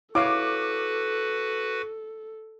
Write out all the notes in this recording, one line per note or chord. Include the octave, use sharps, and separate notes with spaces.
E4 F#4 A4 B4 C#5 F5 D6